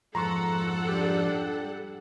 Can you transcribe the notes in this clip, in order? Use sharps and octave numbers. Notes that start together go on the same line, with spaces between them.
F2 G#2 F3 A4 F#5 A#5 C6 C#6
G3 D4 G4